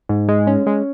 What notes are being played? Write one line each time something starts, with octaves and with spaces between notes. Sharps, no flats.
G#2
G#3
C#4
G#3